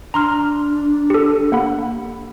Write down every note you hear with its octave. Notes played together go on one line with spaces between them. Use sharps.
D4 A#5 C6 F6
G4 A4
A#3 F#5 B5